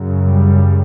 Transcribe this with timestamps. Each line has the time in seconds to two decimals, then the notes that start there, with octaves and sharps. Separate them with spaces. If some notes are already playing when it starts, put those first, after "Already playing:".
Already playing: F#2 C#3
0.22 G3